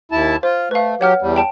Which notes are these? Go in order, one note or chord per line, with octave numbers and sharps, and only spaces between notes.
D#2 E4 A5
F4 C5
A3 B4 F5
F#3 G4 C#5 F#5 F6
E2 G3
G5 A5 D7